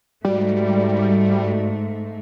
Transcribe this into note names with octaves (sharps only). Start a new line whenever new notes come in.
G#2 G3 A3 F#4 D5